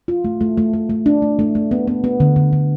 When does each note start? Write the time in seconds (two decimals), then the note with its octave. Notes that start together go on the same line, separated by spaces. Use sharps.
0.08 F4
0.25 A3
0.41 A3
0.57 A3
0.73 A3
0.90 A3
1.06 D4
1.22 A3
1.39 A3
1.55 A3
1.71 B3
1.88 B3
2.04 B3
2.20 D3
2.36 D3
2.53 D3